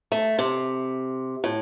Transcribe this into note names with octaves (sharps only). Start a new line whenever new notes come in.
A3
C3
A2